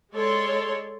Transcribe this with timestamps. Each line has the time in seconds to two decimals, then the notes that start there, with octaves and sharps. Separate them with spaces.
0.13 G#3 A4 C#5 D5 C6